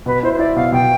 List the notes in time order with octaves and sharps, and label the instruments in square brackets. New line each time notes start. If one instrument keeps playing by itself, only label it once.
[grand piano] B2 [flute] B4
[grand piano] E4 [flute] C5
[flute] C5
[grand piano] E4 [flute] D5
[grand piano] B2 [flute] F5
[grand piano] B2 [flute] G5